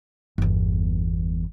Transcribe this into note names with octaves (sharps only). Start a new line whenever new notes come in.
G1 E2